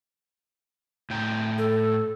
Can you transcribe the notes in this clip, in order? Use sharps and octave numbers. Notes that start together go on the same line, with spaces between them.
A2 G5 A#5
A4